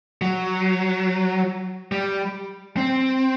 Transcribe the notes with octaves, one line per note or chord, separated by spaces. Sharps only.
F#3
G3
C4